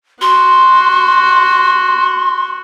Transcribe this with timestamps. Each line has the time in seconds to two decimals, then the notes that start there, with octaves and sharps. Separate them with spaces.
0.22 F#4 C6